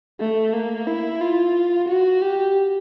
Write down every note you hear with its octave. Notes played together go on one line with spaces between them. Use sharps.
A3
A#3
E4
F4
F#4
G4